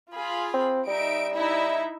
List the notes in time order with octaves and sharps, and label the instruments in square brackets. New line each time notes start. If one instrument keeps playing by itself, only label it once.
[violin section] F4 G#4 B5
[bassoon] C4
[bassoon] G3 [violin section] D#4 E5 D7
[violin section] D#4 E4 E5